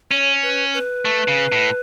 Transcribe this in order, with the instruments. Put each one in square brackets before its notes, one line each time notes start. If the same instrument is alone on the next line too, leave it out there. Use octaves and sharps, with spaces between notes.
[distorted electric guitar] C#4 [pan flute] C#5
[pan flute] B4
B4
[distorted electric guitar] A3
C#3
A2